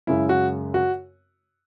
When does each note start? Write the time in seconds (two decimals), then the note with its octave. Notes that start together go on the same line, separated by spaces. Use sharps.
0.07 F#2 C#3 G#3 E4
0.29 F#4
0.74 F#4